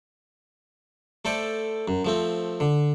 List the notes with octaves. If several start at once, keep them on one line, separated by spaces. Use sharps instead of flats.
A3 A4 C5 D5
F#2
F3 A3 C4
D3